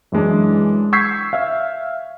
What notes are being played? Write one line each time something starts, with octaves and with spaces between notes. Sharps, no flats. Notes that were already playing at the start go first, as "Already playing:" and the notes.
F#2 E3 G#3 D4
C#6 E6 G6 G#6 B6 C7
E5 F5